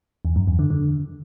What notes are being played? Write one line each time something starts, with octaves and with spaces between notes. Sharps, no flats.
E2
F#2
E2
D3
D3